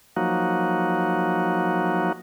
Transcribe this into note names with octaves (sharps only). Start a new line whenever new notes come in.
F3 F#3 A#3 D#4 F#4